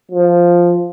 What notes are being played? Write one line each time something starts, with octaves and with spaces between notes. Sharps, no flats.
F3